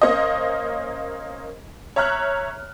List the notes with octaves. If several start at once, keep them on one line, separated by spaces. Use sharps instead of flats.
A#3 C#4 C5 D#5
C#5 E5 A#5 F6 F#6